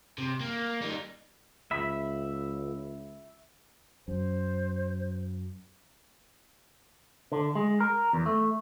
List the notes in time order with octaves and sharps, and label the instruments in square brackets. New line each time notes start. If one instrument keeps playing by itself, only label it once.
[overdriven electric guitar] C3
A#3
G3 D#4
[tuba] C#2 [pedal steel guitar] E5 B5
[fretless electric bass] F#2 [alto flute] C5
[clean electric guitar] D3
G#3
A#4
E2
A3